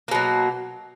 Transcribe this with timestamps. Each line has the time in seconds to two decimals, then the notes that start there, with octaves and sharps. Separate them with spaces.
0.08 A#3
0.11 B2
0.15 F#3